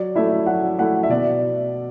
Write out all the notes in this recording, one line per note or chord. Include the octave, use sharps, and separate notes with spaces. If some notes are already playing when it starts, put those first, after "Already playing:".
Already playing: F#3 D5
A3 E4 E5
F#3 F#5
A3 E4 F#5
E5
B2 D5